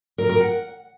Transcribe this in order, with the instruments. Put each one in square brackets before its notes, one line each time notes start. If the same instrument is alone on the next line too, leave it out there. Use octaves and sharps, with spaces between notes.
[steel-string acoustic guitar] A#4
A#4
F#5